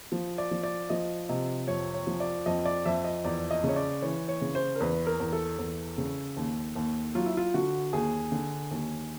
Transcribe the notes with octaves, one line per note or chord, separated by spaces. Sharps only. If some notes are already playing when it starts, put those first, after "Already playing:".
F3
D5
F3
D5
F3 D#5
C3 D#5
F2 C#5
C#5
F3
D5
F2 D#5
D5
F2 E5
D#5
E2 D5
D#5
C#3
C#5
D5
E3 C#5
C#5
C#3
C5
A#4
E2 B4
A#4
E2
A4
E2
C#3
D#2
D#2
F#3 F4
E4
F4
D3 F#4
D#2 G#4
D3
D#2